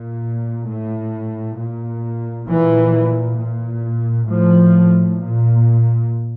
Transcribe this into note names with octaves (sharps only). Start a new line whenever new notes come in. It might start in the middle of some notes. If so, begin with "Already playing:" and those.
Already playing: A#2
A2
A#2
A#2 E3
A#2
A2 F3
A#2